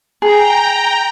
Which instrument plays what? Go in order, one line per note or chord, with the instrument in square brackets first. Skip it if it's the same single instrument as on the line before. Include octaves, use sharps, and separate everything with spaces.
[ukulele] G#4 [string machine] G5 A#5